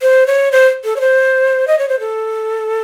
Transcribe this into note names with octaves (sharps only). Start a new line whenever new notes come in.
C5
C#5
C5
A4
C#5
C5
D#5
C#5
C5
A4